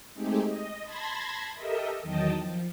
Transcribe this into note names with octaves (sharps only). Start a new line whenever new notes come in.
G#3 A3 C4 D#4 G4 G#4
D#5
A5 B5 C6 G#6 A#6
G4 A4 A#4 D#5 E5
E2 D#3 F#3 D#5 G5 A5
F3